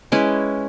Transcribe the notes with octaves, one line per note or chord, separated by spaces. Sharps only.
G#3 C#4 E4 B4